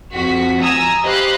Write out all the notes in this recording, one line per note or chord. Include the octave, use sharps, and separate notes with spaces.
F2 F#4 B6
G#5 A#5 D#6 E6
G4 C5 D#5 F5 B5 F#6